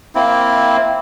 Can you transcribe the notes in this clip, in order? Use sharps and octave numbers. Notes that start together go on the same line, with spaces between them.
A#3 C4 E4